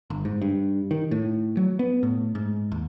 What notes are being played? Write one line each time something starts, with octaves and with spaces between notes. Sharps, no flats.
G1
G#2
G2
D#3
A2
F#3
B3
A2
G#2
D#2